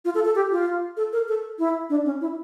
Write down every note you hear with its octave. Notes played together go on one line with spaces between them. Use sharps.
F4
A4
A4
G4
F4
A4
A#4
A4
E4
D4
C#4
E4